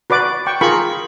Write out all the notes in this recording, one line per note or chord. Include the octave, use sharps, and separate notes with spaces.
F#4 B4 D5 D6
G5 C#6
F4 G#4 A#4 B5 C#6